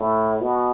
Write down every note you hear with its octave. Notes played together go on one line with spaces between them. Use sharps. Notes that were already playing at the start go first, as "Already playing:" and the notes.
Already playing: A2
B2